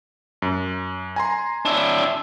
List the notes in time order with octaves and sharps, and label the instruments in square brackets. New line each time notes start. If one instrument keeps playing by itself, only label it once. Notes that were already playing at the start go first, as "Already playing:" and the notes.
[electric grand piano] F#2
G#5 A#5 C6
[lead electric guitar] D4 E4